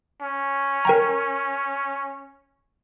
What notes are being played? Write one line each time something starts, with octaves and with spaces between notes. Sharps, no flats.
C#4
A#4 G5 A#5